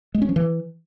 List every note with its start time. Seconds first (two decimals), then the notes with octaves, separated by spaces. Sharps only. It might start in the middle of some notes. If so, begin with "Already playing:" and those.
0.14 G#3
0.22 C#4
0.29 F3
0.36 E3